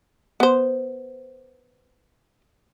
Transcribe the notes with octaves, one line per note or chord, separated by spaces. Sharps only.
B3 C5